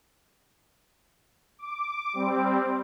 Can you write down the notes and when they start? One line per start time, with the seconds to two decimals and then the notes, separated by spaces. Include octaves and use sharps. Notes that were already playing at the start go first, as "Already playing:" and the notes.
1.59 D6
2.13 G3 C4